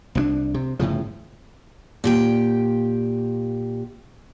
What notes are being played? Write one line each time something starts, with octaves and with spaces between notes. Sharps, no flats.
C2 G#3 D4
C3
G1 A2 C#3 F3
A#2 G4 G5